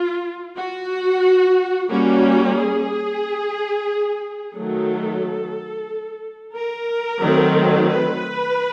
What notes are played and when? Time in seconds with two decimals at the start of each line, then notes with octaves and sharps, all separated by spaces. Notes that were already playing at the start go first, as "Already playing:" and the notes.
Already playing: F4
0.57 F#4
1.90 G3 A#3 C#4 F#4
2.56 G#4
4.55 D#3 F#3 A3 A4
6.54 A#4
7.21 D#3 F#3 A3 C4
7.87 B4